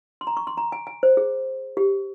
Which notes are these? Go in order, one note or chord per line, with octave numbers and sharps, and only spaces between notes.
C6
A#5
C#6
C6
A#5
G#5
G#5
C5
G#4
G4